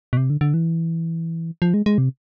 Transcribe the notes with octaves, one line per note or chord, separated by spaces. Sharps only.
B2
C3
D3
D3
E3
F3
G#3
G#3
C3